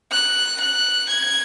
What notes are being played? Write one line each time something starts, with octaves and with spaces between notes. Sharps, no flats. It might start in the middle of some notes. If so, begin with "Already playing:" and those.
F#6
F#6
G#6